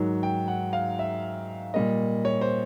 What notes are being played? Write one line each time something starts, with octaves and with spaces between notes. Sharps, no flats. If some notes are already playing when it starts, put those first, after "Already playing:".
Already playing: G#2 D#3 F#3
G5
F#5
F5
E5
A#2 G3 A#3 D#5
C#5
C5